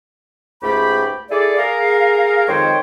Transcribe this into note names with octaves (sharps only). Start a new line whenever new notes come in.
C#2 G#2 A3 G4 G5 B5
E4 G#4 A4 D5
G#4 A#4 F5
F2 D#3 G#3 C5 C#5 G5